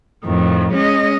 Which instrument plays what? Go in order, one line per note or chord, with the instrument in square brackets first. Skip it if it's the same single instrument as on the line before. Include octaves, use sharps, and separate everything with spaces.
[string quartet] F2 A2 D#3
G#3 C#4 D#5